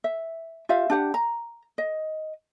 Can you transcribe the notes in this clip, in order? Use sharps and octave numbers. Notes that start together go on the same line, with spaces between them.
E5
F4 G4 E5 F5
D4 G4 F#5
A#5
D#5